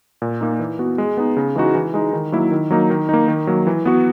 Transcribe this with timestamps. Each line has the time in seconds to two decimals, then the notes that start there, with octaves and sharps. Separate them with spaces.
0.22 A#2
0.41 A#3 D#4
0.59 E3
0.79 B3 F#4
0.98 G#3
1.17 B3 D#4
1.37 C#3
1.56 E3 G#3 D#4 F#4
1.75 E3
1.94 G#3 D#4
2.13 D#3
2.32 F#3 A#3 E4
2.52 D#3
2.70 F#3 A#3 D#4
2.90 D#3
3.09 A#3 D#4
3.28 D#3
3.47 F#3 A#3
3.67 E3
3.85 B3 F#4